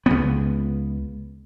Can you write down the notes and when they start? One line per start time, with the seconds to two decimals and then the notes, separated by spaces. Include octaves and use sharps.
0.06 C#2 B3